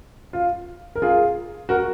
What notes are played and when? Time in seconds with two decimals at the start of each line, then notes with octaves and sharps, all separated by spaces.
0.33 F4
0.95 A#4
1.02 F4 G#4
1.69 F#4 A#4